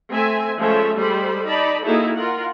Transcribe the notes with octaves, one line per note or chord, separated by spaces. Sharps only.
A3 C4 E5 G#5
F3 G#3 A3 C#4 C#5 E5
G3 G#3 A4 C5 B5
D#4 D5 A5 B5
A#3 D#4 E4 F#4 G#4 A4
F4 A#4 F#5